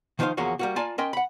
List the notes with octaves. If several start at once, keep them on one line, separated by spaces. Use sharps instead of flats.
D#3 F3 D#4 A#4 C5 F5
E2 C#3 F3 A#3 C#4 F#4
G3 A#3 F#4
A#3 F4 D5 G#5 A5
C#4 A#4 D#5 G5 C6
F#5 B5